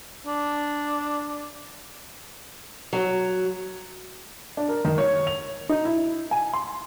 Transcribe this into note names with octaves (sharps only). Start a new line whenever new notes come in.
D4
F#3
D4
A#4
D#3
C#5
F7
D#4
E4
G#5
C6